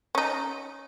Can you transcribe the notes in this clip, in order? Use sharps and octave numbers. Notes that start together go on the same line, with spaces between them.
C#4 D#4